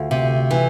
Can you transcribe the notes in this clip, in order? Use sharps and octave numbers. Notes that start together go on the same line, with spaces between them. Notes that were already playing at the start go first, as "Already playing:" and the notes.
Already playing: D2 F4
C3
E3